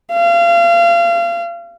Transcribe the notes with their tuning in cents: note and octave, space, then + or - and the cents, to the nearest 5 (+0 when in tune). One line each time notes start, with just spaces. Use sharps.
F5 -35